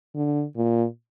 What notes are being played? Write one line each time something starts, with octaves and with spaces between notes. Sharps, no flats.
D3
A#2